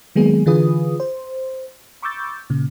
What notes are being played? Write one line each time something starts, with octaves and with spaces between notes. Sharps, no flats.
D#3 F#3 G#3 A#3 B3 G#4
D3 E3 F4 G#4 B4 D#6
C5
B5 C#6 D6 E6 G6 A6
A#2 C#3